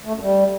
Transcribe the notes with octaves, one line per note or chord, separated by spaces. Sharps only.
A3
F#2
G3